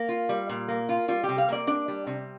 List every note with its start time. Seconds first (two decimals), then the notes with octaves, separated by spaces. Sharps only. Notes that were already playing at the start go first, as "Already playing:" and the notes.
Already playing: A#3
0.09 F4
0.29 G3
0.50 A#2
0.68 A#3
0.89 F4
1.08 G3 F4
1.24 G4
1.29 C3
1.38 F5
1.49 A#3 D5
1.67 D4 D5
1.88 G3
2.07 C3